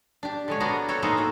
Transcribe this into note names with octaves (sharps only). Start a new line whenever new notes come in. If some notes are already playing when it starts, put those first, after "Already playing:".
D4 G4
D3 G#3 C#5
A#3 B3 D4 F#4 D#5
F#4 A4 C#5 G5
A#3 B3 D#4 G#4 A4 C5
A2 F#4